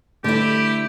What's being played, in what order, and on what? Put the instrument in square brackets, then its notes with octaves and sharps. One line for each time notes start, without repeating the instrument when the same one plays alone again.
[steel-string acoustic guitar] D3 E4 [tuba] A3 [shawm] G4